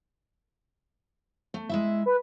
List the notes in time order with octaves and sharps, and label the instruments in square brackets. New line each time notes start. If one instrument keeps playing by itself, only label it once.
[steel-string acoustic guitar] A3
G#3 E4 E5
[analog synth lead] B4